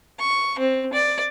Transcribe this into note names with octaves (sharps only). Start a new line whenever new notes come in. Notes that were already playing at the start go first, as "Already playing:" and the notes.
C#6
C4
D5